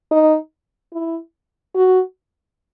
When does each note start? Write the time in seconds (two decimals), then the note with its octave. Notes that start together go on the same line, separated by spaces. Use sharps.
0.11 D#4
0.93 E4
1.76 F#4